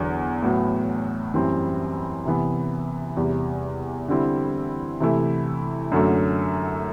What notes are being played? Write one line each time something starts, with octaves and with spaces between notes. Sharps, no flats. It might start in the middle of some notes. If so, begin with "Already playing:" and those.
Already playing: E2 D3 F#3
A2 F#3 B3
F#2 E3 G3 C4 E4
C3 E3 B3
E2 C3 G3
D3 G3 C4 E4
C3 E3 A3 E4
F#2 D3 F#3 A3